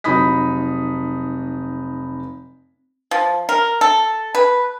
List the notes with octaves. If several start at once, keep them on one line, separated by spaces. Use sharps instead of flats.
F1 F#3 D#4 B5 D#6 B6
F3
A#4
A4
B4